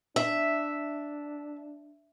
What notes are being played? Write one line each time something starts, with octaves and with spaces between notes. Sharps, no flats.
D4 E5